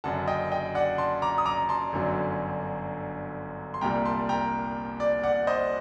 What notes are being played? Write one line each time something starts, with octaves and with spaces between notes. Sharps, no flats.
F#1 F#2 D3 F#5 A5
D#5 G5
D#5 G5
D5 F#5
A5 C6
A#5 D6
D#6
A#5 D6
A5 C6
G1 F#2 D3 F#3
C6
C2 A#2 G3 G5 A#5
A5 C6
G5 A#5
D5
D5 F#5
C5 D#5